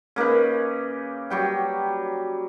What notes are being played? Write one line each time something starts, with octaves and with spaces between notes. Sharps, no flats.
C#3 A#3 D#4 B4
F#3 G3 G5